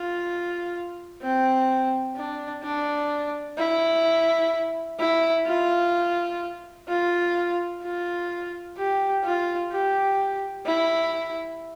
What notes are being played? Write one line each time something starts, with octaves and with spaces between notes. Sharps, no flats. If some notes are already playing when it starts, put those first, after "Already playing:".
Already playing: F4
C4
D4
D4
E4
E4
F4
F4
F4
G4
F4
G4
E4